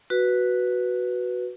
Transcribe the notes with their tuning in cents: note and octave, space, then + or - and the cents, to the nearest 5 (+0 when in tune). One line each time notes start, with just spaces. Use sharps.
F#4 +0 B4 -5